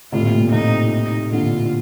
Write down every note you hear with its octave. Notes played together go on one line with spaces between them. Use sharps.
A2 C3 F4
A#2
A2
A#2
A2 C3 D#4
D#4
A#2 D3 F4